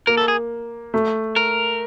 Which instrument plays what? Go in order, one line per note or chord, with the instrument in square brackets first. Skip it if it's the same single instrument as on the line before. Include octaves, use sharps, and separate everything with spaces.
[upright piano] A#3 [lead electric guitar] A#4
[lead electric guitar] A4
G#4
[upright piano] A3
[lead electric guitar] A#4